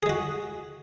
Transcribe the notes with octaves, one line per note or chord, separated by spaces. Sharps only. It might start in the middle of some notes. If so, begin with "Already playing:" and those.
G#3 F#4 G#4